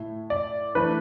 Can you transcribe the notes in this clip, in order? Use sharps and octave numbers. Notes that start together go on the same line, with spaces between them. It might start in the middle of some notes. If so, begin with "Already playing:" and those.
Already playing: A2 A3 E4
D5
E3 A3 D4 B4